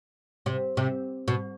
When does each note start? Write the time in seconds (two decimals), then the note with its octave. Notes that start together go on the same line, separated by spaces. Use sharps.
0.46 C3
0.77 C3
1.28 B2